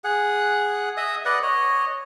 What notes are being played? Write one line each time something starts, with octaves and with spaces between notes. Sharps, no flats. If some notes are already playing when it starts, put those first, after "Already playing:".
G#4 F#5
D#5 E5 D#6
B4 D5 D#5 F#5
C#5 D#5